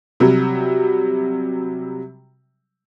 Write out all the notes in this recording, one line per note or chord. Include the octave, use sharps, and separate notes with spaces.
C3 F#3 G3